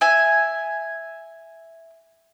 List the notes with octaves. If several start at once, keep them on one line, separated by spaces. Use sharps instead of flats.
E5 G#5